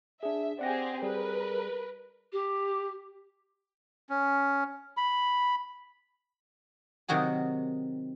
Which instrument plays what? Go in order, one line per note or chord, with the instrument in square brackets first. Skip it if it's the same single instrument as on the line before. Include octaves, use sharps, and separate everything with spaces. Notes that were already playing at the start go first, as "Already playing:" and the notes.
[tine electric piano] D4 G#4 [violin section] E5
[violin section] C4 G4 G#4 [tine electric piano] D5 F#5 A#6
[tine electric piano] G3 G#4 [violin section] A#4 B4
[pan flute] G4
[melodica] C#4
B5
[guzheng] C3 D#3 F#3 F#4 G#4